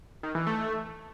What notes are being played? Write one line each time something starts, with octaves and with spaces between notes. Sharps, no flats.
D#3
E3
A3